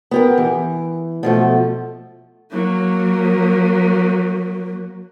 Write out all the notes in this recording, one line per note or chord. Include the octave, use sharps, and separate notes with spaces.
B3 G4 A#4
E3
B2 F3 A3
F#3 A#3